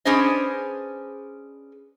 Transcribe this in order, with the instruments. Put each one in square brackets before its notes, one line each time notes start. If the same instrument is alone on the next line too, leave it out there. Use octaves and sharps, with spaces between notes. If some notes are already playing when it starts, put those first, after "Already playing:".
[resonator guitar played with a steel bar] C#4 D4 G#4 B4 C5 D#5